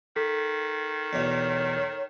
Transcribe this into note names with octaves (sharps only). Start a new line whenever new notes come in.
D#3 A4 B6
E2 B2 C#5